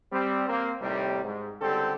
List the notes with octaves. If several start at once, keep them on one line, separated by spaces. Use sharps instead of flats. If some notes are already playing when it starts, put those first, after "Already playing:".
G3 C4
A#3 C4
D#2 A2 C3 D#3 G3
G#2
C#2 D3 G3 C4 G4 A4